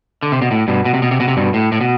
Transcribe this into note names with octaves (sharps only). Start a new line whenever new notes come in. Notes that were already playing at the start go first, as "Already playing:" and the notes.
D3
C3
B2
A2
G2 B2
B2
C3
B2
C3
B2
C3
G2 B2
A2
A2
B2